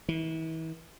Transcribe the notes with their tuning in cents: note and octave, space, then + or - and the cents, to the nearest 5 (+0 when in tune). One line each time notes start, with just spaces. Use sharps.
E3 -35